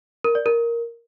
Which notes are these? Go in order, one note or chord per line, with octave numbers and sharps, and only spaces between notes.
A#4
D5
A#4